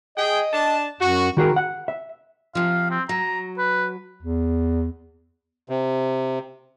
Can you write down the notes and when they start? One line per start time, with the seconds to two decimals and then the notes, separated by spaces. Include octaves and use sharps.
0.18 G#4 D#5 G5
0.53 D4 A5
1.01 F#2 F#4
1.37 D#3 F#4 G#4 A#4
1.56 F#5
1.88 E5
2.55 C3 F3 F5
2.91 C4
3.09 F#3 A#5
3.58 B4
4.23 E2
5.69 C3